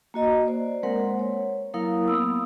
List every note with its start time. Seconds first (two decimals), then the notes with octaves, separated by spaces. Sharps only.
0.14 A#3 F#4 D#5 A#5
0.46 C5 D5
0.83 G#3 A#3 C4 A#4 C5 F#5
1.19 C#5
1.74 F#3 A#3 E4 A#4 F5 D#6
2.08 B3 C4 D#6 E6